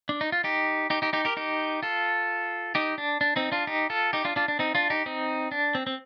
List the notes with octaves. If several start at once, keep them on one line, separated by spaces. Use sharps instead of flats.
D4
D#4
F4
D#4 G4
D#4 G4
D#4 G4
D#4 G4
G4 A#4
D#4 G4
F4 A4
D#4 G4
D4
D4
C4 D#4
D4 F4
D#4 G4
F4 A4
D#4 G4
D4 F4
D4 F4
D4
C4 D#4
D4 F4
D#4 G4
C4 D#4
D4
C4
C4